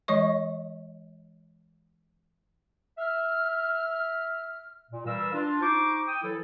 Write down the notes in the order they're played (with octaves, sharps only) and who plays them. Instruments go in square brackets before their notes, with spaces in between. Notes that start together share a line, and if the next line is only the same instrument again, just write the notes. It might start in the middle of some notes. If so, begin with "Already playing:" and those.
[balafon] E3 G#3 C#5 D#5 C#6
[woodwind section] E5 F6
A#2
E3 G3 A#4 F5 E6
D4 F4
D#4 C5 C#6 D6
G5 D#6
E3 F#3 E4 A4